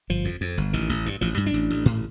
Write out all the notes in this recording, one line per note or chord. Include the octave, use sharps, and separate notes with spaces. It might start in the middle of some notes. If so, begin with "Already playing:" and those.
G1 F3
F2
F2
G1
A1 D#3
A1
G2
A1 F3
G2
D4
A1
A1
A2